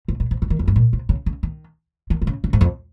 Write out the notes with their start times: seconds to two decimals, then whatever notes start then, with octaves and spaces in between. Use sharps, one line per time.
0.08 C3
0.20 A#2
0.31 C3
0.42 C#3
0.50 D#3
0.59 F2
0.67 G2
0.76 A#2
0.93 C3
1.09 C#3
1.26 C#3
1.43 D#3
2.10 D#3
2.22 D#3
2.27 C#3
2.44 C#3
2.53 G#2
2.61 F2